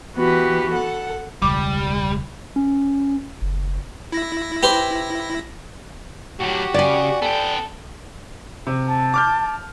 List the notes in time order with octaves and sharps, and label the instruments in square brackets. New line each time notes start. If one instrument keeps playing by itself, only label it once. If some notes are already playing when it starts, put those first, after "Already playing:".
[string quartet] E3 B3 F#4 G4 B4
A4 F#5
[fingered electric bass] E1 C#2 [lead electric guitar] G3 [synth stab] D6
[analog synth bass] C#4
F#1
[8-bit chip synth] E4 A#6
[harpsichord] G4 B4 C5
[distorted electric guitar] A2 F#3 [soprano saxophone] F#4 [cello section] G4
[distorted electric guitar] C#3 [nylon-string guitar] D5 G#5
[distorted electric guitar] B3 G5 [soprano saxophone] A4
[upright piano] C3
[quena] A5
[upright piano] D6 F6 G6